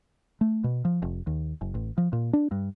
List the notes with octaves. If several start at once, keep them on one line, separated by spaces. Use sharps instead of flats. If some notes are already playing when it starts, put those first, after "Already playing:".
A3
B2
F3
F1
D#2
F#1
A1
F3
A#2
D4
G2